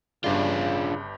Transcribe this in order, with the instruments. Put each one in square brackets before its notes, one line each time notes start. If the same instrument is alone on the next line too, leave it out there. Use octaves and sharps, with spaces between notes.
[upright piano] G1 G2 D5 [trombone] C#3 [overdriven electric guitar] D4 F4